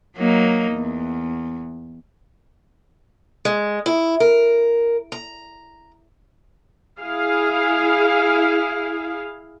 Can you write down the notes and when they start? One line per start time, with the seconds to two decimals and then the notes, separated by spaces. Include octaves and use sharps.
0.17 F#3 A#3 D#4
0.72 E2
3.45 G#3
3.86 E4
4.20 A#4
5.12 A#5
6.99 E4 G#4 F5